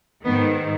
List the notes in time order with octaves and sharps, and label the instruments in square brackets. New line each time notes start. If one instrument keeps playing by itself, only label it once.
[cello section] G#2 D#3 B3